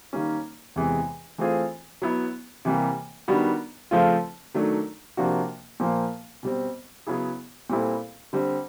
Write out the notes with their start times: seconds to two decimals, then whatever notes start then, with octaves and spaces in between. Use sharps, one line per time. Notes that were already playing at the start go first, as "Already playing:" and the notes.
0.13 D#3 G3 A#3 C#4
0.76 E2 C3 E3 G#3
1.38 E3 A3 C4 F4 G#4
2.02 F#3 B3 E4
2.65 C3 E3 G3 A#3
3.28 D#3 G3 B3 D4 F#4
3.91 C#3 F3 A3 C4 F4
4.54 D#3 F#3 A3 D4
5.17 C3 F3 A#3 D4 F#4
5.80 A#2 F3 A#3
6.43 B2 G3 C4
7.07 C#3 F#3 B3 E4 G#4
7.70 A#2 G3 C4 E4 A4
8.33 D3 G3 C4